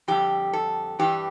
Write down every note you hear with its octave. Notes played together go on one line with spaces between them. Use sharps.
F2 D3 G3 G4
A4
G2 E3 G3 G4